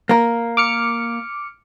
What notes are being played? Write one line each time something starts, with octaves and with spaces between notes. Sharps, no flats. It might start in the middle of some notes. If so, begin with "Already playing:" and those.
A#3 A#4
D6 F6 C#7